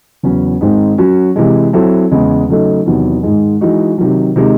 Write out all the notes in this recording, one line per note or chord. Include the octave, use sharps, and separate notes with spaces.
E2 C#3 F#3 C#4
G#2 D#3 G#3 C4 D#4
F#3 C#4 F#4
C3 E3 G#3
F#3 C4 E4 A4
E2 C#3 G#3
C#3 F#3 A3 D#4 A4
E2 C3 D#3 F#3
G#2 D#3 G#3
E3 G#3 D#4 F#4
C3 D#3 F#3
C3 D#3 G#3 D#4